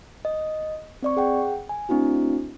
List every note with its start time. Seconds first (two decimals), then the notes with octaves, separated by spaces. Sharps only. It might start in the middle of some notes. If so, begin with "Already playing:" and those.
0.25 D#5
1.03 C4 D5 C#6
1.17 G#4 F#5 G5
1.69 G#5
1.89 A3 C4 D4 E4 F#4